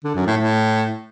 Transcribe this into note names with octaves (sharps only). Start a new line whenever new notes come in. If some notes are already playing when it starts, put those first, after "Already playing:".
D3
F#2
A2
A2